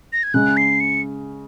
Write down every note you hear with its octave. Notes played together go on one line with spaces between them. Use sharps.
A#6
G#6
C#3 G#3 C#4 F#6
C7
C#7